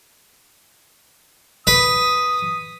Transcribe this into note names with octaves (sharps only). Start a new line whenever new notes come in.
B4 D#6